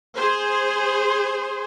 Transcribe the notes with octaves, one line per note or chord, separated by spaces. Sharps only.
G#4 C5